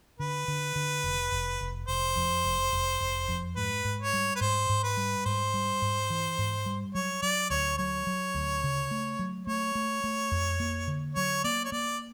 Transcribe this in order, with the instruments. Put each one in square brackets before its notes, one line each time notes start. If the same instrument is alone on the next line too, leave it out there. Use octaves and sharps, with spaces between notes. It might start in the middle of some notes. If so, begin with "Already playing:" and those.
[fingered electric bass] D3 [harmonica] B4
[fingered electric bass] D3
D3
F1
F1
F1
[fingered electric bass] F1 [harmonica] C5
[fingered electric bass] F2
F1
F1
F1
F2
[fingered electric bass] G#2 [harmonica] B4
[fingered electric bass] G#2
[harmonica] C#5
[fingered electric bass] G3
[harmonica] B4
[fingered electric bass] G#2 [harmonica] C5
[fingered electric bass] G#2
[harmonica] B4
[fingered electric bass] G3
[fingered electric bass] G#2 [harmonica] C5
[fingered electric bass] G3
G#2
E3
G#2
G3
[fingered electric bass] F#3 [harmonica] C#5
[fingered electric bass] F#3 [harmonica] D5
[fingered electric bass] D2 [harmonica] C#5
[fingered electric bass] F#3 [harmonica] C#5
[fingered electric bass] F#3
D2
C#3
A3
F#3
[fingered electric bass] A3 [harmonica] C#5
[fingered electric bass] A3
A3
F2
A#3
D3
[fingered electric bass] F#3 [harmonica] C#5
[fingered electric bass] A#3 [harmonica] D5
[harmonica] C#5
[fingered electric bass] A#3 [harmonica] D5